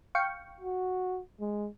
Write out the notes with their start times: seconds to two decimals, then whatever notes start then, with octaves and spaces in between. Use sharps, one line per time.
0.15 F5 G5 C#6
0.60 F#4
1.40 G#3